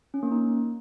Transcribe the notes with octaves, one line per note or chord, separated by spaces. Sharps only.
C#4
A#3
D#4